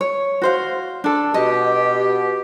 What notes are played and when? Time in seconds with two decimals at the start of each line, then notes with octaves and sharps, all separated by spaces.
0.01 C#5
0.42 F#4 C5 F5
1.04 D4 A4
1.34 B2 G4 D#5